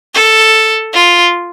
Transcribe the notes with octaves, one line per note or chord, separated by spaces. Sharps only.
A4
F4